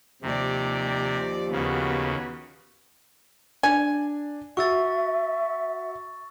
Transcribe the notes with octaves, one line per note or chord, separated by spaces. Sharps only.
D#2 C3 F3 G4 D5
D#2 C#3 B3 F#4
D4 G#5
F#4 E5 C#6 E6 A6